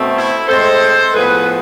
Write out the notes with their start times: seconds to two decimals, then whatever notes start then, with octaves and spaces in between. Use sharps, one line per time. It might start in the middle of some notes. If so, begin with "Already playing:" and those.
Already playing: B2 A3 C4
0.14 E4
0.47 A2 G#3 C4 A4 C5
1.13 A2 F3 B3 G#4 B4